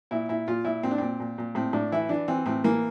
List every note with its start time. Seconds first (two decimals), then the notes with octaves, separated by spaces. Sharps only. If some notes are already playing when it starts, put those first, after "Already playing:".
0.11 A#2 E4
0.29 A#2 E4
0.48 A#2 F4
0.65 A#2 E4
0.83 A#2 C4
0.91 D4
0.98 A#2 C4
1.20 A#2
1.38 A#2
1.55 A2 C4
1.73 A2 D4
1.92 E3 E4
2.09 E3 D4
2.28 E3 C4
2.46 A2 C4
2.64 E3 A#3